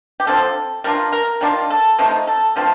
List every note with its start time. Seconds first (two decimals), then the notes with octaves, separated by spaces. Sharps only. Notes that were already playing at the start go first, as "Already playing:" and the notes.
0.20 G4
0.27 D3 F3 C4 A4
0.84 G3 D4 F4 A#4
1.12 A#4
1.41 D#3 G3 D4 F4
1.70 A4
1.99 C3 F3 A3 D#4
2.27 A4
2.56 D3 F3 A3 C4